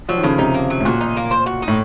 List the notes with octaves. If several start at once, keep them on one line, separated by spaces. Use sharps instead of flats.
F3 F#3
D#3
A2 C#3
C3 D#4
A#3
F#3
A2
A#2 F#4
D#4
A#3
C5
F#4
D#4
A2